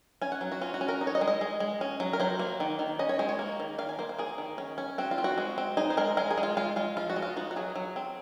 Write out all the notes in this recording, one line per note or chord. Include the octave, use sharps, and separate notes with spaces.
C#4 G#5
F#5
F#3
F#4
C#4 F4
F#4
C#4
A#4
D#4
C#5
D#5
G#3
D#5
G#3
G#3
C#4
F#3
A#4
F#3 C5
A#3
D#3
D#3
C#4 D#5
C#5
G#3 C5
C#5
A#3
D#3
D#3 F5
G#5
A#3 C5
C5
A#3 G#4
D#3
C#4
C#4
C4 F#4
F4
C4
F#4
G#3
C4
D#4 G#4
C5
G#3 A#4
G#3 A#4
G#4
G#3
F4
G#3 F4
G#3 F4
F3 F4
F#4
G#3
F4
D#4 F#4
F#4
F#3 G#4
F#3
C4